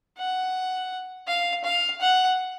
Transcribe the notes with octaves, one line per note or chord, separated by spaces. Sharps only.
F#5
F5
F5
F#5